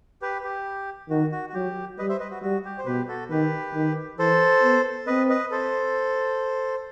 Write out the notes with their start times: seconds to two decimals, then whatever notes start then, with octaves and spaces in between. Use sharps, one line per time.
0.22 G4 B4
0.44 G4
1.10 D#3 F#4
1.32 F#4
1.49 F#4
1.54 F#3 G4
1.98 G3 B4 D#5
2.09 C5 E5
2.20 B4 D#5
2.31 F#4
2.42 G3 F#4
2.65 G4
2.78 C5
2.86 B2 G4 B4
3.08 F#4 A4
3.30 D#3 G4 B4
3.75 D#3
4.19 E3 A4 C5
4.64 B3
5.07 C4 B4 D#5
5.30 B4 D#5
5.51 A4 C5